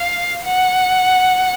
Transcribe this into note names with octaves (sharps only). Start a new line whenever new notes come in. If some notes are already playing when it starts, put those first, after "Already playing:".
Already playing: F5
F#5